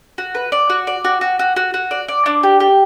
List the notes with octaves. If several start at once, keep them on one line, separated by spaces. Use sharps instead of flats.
F#4
B4
D5
F#4
D5
F#4
F#4
F#4
F#4
F#4
D5
D5
D4
G4
G4